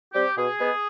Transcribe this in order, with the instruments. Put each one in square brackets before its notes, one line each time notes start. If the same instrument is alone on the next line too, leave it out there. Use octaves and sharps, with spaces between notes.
[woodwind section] G3 C4 G4
B2 G#4
G#3 B3